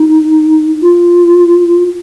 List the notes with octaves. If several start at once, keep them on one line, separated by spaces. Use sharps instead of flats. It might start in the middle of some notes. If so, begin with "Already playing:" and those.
Already playing: D#4
F4